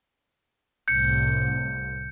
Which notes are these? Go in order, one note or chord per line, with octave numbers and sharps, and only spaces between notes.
C2 A2 G6 C#7